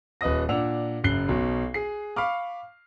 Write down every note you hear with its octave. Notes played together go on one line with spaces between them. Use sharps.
D#1 B4 D#5 D#6 A#6
A#2 D4 F#5 E6 F7
F#1 F#2 F#6 C7 G7
B1 B2
G#4 C7
F5 B5 C#6 D6 F6